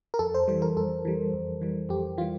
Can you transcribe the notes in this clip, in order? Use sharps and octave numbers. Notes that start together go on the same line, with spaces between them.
A#4
F2 A4
C5
E3 G3 C5
A#4
F2 A4
E3 G3
F2
E3 G3
F2 G4
E3 G3 F4